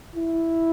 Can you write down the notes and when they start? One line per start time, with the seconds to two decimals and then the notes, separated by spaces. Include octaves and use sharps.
0.16 E4